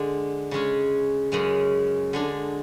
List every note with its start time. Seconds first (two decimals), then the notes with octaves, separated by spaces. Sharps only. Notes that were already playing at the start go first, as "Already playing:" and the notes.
Already playing: D3 G#3 D4
0.51 C#3 G#3 C#4
1.32 F#2 C#3 G#3
2.13 D3 G#3 D4